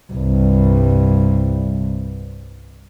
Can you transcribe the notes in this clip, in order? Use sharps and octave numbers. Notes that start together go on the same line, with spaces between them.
C2 G2